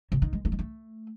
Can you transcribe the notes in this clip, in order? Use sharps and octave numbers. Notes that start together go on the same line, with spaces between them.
C3
D#3
G#3
A3
G#3
A3